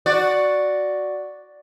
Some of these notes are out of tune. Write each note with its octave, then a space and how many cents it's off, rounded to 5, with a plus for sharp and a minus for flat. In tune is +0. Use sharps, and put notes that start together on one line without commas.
F#4 +0 D5 +0